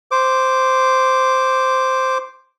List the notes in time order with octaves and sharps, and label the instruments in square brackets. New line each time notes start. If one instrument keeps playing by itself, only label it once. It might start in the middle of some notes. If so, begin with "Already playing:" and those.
[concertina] C5 D6